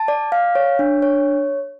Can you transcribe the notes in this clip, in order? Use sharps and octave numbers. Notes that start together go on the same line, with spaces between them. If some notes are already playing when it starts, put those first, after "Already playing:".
Already playing: A5
D5
F5
C#5
D4
C#5